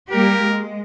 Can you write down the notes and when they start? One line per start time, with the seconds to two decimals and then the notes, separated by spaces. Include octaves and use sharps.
0.12 G3 A#3 G4 A#4
0.41 G#3